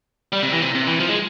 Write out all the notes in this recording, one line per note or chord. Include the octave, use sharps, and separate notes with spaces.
G3
C3
E3
C3
C3
E3
F3
G#3